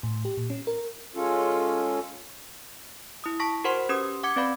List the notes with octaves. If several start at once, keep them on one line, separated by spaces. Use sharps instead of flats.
A2
G4
A#2
C#4
A#4
G#3 C#4 F4 A4
E4 D#6
A5 C#6 A#6 B6
F#4 A#4 C5 F#5 C6
C#4 G4 B4 D#6
F#5 D6 G#6 C#7
C4 B4 D5 F5 B5